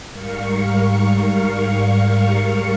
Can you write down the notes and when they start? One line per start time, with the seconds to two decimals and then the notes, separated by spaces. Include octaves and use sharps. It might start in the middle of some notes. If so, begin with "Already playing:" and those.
0.11 G#2 G3 A#4 F5 C#6 C#7